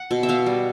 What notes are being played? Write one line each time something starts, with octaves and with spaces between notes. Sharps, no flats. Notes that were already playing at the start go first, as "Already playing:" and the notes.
Already playing: F#5
B2
E5
B3 F5
G3